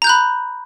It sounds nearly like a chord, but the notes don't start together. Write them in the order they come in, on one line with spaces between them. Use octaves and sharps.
A#5 G6 F#6 B5